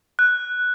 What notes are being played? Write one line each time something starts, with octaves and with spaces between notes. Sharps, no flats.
F#6